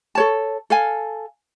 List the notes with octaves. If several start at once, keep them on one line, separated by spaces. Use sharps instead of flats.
A4 C#5 A5
A4 F5 G#5